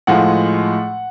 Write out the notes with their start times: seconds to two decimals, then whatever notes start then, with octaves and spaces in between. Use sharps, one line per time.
0.07 A2 F3 G#3 F#5